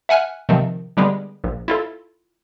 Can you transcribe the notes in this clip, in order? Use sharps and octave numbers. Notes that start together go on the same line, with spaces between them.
E5 F#5 G#5 F6 F#6
C3 D#3 F3
D3 G3 G#3 B3
A#1
E4 F4 A4